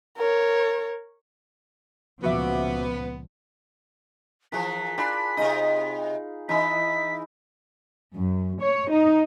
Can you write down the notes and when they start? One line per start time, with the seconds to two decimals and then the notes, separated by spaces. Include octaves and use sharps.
0.17 A#4 C#5
2.23 C#2 A#2 F3 B3 F#4 E5 D6
4.52 E3 F3 G#4 A#4 B6
4.98 D4 F4 G#5 B5
5.37 C3 D#4 F4 G#4 D#5
6.49 E3 D#4 E4 D#5 B6
8.15 F#2
8.62 C#5
8.91 D#4